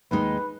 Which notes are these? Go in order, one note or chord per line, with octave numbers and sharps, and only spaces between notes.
D#2 D#3 G#3 D#4 B4